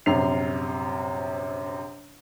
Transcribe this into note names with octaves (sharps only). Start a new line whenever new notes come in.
A#1 F#2 C3 C7 F7